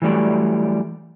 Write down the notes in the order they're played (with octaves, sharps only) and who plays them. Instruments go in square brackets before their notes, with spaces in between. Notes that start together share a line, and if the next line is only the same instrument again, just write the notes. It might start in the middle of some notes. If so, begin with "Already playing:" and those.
[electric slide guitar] E3 F#3 G3 A3 D5